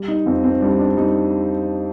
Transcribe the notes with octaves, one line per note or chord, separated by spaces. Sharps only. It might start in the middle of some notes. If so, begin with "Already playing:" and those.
Already playing: G3
D#4
F2 C4
C4
G3 D4
D4
G3 D#4